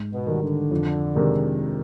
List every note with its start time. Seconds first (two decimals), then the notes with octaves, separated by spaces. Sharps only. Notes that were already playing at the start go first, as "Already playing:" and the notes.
Already playing: G#2
0.12 B2
0.27 D#3 G3
0.42 D3
0.71 F2
1.15 C3 D#3 G#3 D4